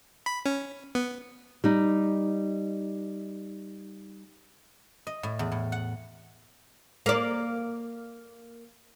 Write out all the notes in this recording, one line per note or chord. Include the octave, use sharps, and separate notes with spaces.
B5
C#4
B3
G3 D#4
D#5
A2
E2
A2
F#5
A#3 D5